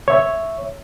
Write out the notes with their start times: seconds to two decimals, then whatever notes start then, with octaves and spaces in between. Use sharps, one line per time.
0.08 C#5 E5